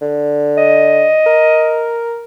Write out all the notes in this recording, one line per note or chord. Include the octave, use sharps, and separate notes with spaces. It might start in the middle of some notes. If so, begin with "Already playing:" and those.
D3
D#5
A#4